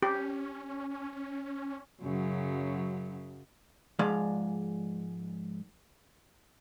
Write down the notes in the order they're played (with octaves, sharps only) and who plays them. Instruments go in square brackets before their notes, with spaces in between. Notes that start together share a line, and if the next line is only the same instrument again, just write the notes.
[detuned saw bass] C#4 [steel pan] G4
[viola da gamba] F#2 C#3 F#3
[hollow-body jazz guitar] G#2 F3 G#3 D5 F5